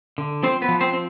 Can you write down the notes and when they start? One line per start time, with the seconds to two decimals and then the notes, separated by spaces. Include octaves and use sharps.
0.18 D3
0.43 F3 C4 C5
0.62 B3 B4
0.68 F3
0.81 C4 C5
0.93 C4